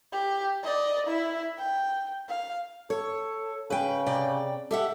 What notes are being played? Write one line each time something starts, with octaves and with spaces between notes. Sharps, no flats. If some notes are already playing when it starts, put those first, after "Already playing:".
G4
D5 D#5
E4 E5
G5
F5
A4 C#5
C#3 B4 G5
C3 D5 G5
G4 A4 E5 F#5